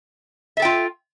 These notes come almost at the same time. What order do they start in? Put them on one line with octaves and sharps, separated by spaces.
E5 A4 G5 F4